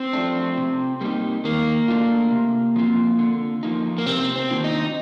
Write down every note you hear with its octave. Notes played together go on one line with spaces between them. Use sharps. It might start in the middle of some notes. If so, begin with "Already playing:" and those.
Already playing: C4
F3 A3 D4
C3
G3 A#3 D#4 G4
D#3 A#3
A3 D4 F4
C3
F3 C4 F4
D3
F3 A#3 D#4
A#3
C3 C4
C4
D#3 A#3 D4 F4
D#4